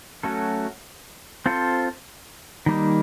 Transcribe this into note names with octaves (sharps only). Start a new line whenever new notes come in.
F#3 A3 C#4 F#4 A4
C4 F4 A4 C5
D#3 G3 A#3 D#4